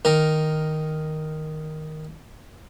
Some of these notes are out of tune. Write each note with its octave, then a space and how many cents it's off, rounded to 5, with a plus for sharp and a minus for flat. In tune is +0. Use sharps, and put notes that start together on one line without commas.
D#3 +0 A#4 +0